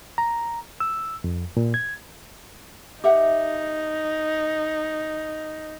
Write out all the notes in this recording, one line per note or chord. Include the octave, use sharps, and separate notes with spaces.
A#5
E6
F2
A#2
G#6
D#4 G4 E5 F#5